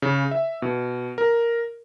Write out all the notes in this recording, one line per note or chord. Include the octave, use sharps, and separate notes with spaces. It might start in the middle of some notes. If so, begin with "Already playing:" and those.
C#3
E5
B2
A#4